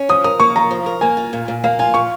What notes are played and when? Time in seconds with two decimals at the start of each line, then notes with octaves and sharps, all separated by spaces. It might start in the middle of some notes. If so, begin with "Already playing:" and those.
Already playing: C#4
0.09 F3 D#6
0.24 A#4 D#6
0.40 A#3 C#6
0.56 F4 A#5
0.71 F3
0.86 A#4
1.01 A#3 G#5
1.17 F4
1.33 A#2
1.48 A#2
1.64 A#3 F5
1.79 F4 G#5
1.94 A#2 C#6